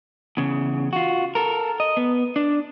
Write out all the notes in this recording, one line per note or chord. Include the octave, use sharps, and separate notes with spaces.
E2 C#3
F4 F#4
A4 A#4
D#5
B3
D4